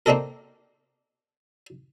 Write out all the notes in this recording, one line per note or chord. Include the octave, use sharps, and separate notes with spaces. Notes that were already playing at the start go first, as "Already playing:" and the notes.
A#3 C4 D4 D#4 A4 A#4